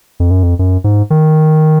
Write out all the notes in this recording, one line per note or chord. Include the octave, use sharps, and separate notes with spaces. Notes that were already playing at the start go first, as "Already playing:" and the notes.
F2
F#2
F2
F#2
G#2
D#3